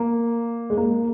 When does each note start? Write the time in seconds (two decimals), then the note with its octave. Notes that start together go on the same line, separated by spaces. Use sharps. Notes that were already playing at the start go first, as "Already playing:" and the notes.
Already playing: A#3
0.70 G#3
0.77 A#3